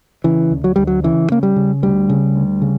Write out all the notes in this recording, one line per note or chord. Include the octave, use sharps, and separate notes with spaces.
C#3 E3
D2
F#3
D2 G3
F#3
C#3 E3
C#3 A#3
G3
C#3
D2 G3
C#3
D2
C#3